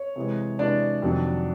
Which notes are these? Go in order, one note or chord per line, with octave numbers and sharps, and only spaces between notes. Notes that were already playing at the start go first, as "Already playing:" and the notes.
Already playing: C#5
C3 E3 G#3
C3 E3 G#3 D4 D5
F2 C3 D#3 F#3